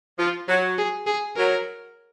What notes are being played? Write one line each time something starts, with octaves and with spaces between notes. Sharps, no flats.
F3 F4
F#3 F#4
G#4
G#4
F#3 A#4